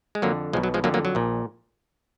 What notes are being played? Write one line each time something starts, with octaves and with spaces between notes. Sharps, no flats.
G#3
F2 D3 F#3 A#3
B1 B2 F3 G#3
F#3
F3 G#3
F2 D3 F#3 A#3
F#3 A#3
F#3
A#1 A#2